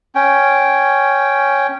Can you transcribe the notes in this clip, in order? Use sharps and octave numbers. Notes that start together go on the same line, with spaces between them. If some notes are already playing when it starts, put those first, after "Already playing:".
C#4 G5